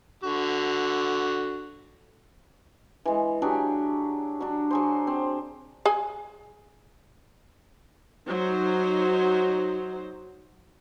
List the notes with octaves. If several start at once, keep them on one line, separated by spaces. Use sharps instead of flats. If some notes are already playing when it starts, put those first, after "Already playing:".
D3 F#4
E3 G#3
F#3 D4 G4 G#4
F#3 D4
F#3 G#4 C5
C4
G#4 G#5
F#3 D#4 C5